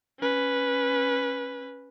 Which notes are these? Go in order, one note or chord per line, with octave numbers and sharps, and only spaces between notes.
C#4 B4